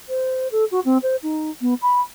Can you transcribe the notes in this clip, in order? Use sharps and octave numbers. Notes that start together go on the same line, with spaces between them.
C5
A4
F#4
C4
C5
D#4
B3
B5